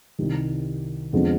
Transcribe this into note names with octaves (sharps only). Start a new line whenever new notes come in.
C2 C3 D#3
F2 D3 F3 G#3 B3